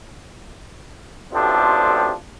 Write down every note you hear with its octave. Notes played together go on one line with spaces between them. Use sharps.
A1 D2 C3 F3 C4 D4